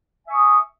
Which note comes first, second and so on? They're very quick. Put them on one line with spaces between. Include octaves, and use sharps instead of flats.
E5 G#5 C#6 D#6